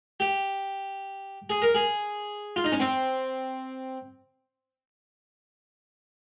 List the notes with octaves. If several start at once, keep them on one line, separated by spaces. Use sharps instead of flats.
G4
G#4
A#4
G#4
F4
D#4
C#4
C4